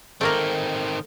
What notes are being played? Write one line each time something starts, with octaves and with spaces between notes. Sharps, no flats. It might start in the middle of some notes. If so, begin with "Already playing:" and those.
D#3 A3 A#3 C4 A#4